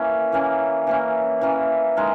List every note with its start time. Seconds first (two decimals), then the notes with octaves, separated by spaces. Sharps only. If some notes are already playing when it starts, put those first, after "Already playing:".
Already playing: E3 A#3 C#4
0.32 E3 A#3 C#4
0.87 E3 A#3 C#4
1.41 E3 A#3 C#4
1.97 D#3 G#3 D#4 A#4